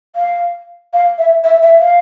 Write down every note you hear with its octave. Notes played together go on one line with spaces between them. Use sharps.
F5
F5
E5
E5
E5
F5